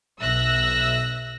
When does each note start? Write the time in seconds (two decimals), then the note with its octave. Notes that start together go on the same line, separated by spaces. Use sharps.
0.19 B1 E5 E6 F#6 A#6